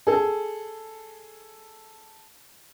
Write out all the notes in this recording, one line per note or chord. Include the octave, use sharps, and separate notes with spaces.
G#4 A4